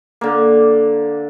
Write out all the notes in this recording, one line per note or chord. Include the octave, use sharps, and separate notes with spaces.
D3 A#3